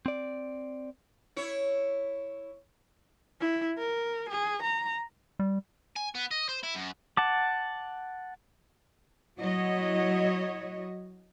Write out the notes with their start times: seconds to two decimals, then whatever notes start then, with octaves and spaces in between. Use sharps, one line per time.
0.06 C4 D5
1.36 E4 C#5
3.40 E4
3.78 A#4
4.29 G#4
4.63 A#5
5.39 G3
5.96 G#5
6.15 B3
6.31 D#5
6.49 C5
6.63 E4
6.75 F#2
7.17 F#5 A5 D6
9.39 F#3 E4 F#4 C#5 D#5